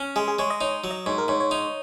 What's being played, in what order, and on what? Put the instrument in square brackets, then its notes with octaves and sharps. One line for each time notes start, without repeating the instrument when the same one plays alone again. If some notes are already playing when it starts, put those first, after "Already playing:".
Already playing: [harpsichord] C#4
[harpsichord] G#3 [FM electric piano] G#4
[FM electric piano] G#4
[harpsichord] G#3 [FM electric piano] C#5
[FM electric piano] D#5
[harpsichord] D#4 [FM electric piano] C#5
[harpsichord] F#3
[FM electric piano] D#5
[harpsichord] G#2 [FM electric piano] C#5
[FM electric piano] A#4
[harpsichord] G#2 [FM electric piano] C#5
[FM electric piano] C#5
[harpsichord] D#4